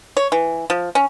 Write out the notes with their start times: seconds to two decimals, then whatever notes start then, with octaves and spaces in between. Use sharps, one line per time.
0.17 C#5
0.32 E3
0.70 F3
0.95 C#4